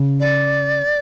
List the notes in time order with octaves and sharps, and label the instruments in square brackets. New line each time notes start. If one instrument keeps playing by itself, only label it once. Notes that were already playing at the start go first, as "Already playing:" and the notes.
Already playing: [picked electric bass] C#3
[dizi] D5